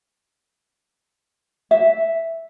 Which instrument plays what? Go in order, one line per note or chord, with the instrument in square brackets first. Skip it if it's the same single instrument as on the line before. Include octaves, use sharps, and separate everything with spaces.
[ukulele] E5